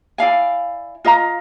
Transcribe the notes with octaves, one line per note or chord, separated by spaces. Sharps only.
E4 D5 F5 G#5
F4 D#5 F5 A#5